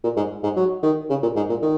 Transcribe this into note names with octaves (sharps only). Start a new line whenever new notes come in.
A#2
G#2
G#2
F#3
D#3
C#3
A#2
G#2
A#2
D#3